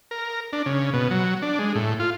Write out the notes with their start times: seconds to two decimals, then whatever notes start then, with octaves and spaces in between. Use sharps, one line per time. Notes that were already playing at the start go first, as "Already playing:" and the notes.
0.11 A#4
0.53 D4
0.66 C#3
0.93 B2
1.11 F#3
1.42 D4
1.59 G#3
1.75 A2
2.00 F4